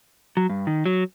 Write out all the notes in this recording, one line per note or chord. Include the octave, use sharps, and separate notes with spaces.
F#3
G2
D#3
F#3